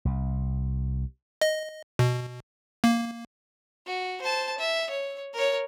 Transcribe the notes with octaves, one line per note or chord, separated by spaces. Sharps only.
C2
D#5
B2
A#3
F#4
C5 A5
E5
C#5
A#4 C#5